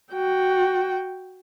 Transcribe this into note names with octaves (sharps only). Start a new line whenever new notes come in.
F#4 G5